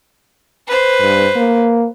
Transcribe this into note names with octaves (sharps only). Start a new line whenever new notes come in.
B4 C5
G2
A#3